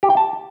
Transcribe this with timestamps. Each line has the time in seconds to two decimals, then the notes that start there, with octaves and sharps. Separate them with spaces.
0.03 G4
0.10 G5
0.17 A5